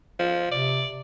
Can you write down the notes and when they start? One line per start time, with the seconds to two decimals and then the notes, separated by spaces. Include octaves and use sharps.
0.19 F3
0.51 C3 D5